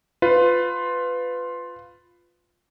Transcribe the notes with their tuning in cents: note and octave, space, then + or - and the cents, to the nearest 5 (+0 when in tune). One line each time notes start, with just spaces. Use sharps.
F4 +5 B4 +20